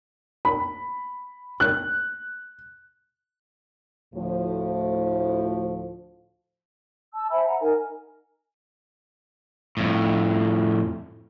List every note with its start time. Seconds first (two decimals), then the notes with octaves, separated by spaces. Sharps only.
0.45 B5
1.60 F#6
4.15 D2 A2 F3
7.14 A5 E6
7.31 C5 E5 G#5 B5
7.45 F#5 A#5
7.61 D#4 A#4 G#5
9.77 F2 A2